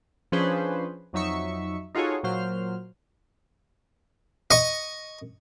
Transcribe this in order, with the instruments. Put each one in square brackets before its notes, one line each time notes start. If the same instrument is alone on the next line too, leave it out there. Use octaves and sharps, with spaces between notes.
[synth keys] F3 C#4 D4 G#4 B4 C5
F2 F#3 D#4 E5 C#6
D#4 F4 F#4 G#4 A4 C#5
A#2 F#3 C5 F6
[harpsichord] D#5 C#6